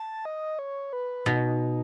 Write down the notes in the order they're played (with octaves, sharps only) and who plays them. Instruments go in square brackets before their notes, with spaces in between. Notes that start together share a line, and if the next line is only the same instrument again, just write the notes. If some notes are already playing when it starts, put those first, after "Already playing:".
Already playing: [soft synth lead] A5
D#5
C#5
B4
[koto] B2 [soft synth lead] D#4